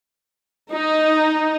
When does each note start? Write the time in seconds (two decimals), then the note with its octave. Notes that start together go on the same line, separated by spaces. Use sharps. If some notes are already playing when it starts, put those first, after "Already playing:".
0.71 D#4